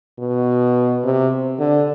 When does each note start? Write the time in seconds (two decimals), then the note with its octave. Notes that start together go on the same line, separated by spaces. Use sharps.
0.19 B2
1.04 C3
1.59 D3